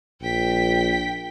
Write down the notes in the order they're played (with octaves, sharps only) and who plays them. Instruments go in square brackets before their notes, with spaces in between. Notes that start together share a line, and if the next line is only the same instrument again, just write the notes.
[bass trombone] A#1 [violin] G5 B6